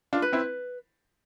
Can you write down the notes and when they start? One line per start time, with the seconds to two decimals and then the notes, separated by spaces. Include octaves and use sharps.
0.13 D4 F4
0.22 B4
0.33 C4 E4